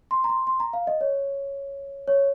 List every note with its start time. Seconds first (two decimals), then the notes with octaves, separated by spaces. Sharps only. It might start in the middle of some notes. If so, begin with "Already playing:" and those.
0.11 C6
0.24 A#5
0.29 C6
0.47 C6
0.60 A#5
0.73 F5
0.87 D#5
1.01 C#5
2.08 C#5